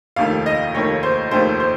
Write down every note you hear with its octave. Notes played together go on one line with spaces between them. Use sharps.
F1 D#2 D#3 A3 F5
D#5
F1 D#2 D#3 A3 C#5
C5
F1 D#2 D#3 A3 C5
C5